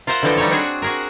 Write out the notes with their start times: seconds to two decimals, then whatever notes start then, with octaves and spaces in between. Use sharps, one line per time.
0.07 F4 A#4 C5 E5 F#5
0.23 D3 E3 F3 A4 D#5 G5
0.38 G3 D#4 C#5
0.51 C4 D4 F#4 G#4 C#5
0.82 F#4 G#4 A#4